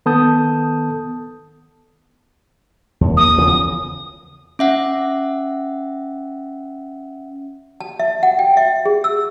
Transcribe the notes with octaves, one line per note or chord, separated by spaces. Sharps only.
D#3 B3 A4 A5 D#6 G6
D#2
D#6
E2 C#3 F3
C#4 E5 F#5
A5
E5
F#5
G5
E5
G#4
E6